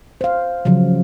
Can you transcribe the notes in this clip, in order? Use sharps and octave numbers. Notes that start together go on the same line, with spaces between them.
C5 F5
C#3 F3 F#3